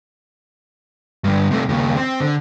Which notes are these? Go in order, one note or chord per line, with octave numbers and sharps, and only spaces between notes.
G2 D3
C3 A3
D#2 C#3
C4
D3